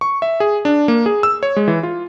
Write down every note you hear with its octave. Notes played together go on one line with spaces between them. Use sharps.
C#6
E5
G#4
D4
A#3
G#4
E6
C#5
G#3
E3
F4